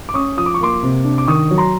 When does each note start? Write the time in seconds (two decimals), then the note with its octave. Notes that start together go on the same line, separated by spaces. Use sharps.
0.09 D6
0.14 C#4 C#6 D#6
0.37 F3 D#6
0.46 D6
0.54 C#6
0.60 A#3 C6 D6
0.83 C3
1.04 D4
1.18 D6
1.27 D#3 C#6 D#6
1.51 F#3
1.58 A#5 C6